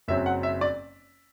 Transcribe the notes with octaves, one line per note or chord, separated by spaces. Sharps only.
F#1 F#2 F#3 C4 E5
F#5
E5
D5